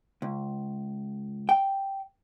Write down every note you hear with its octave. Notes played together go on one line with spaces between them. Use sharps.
C#2
G5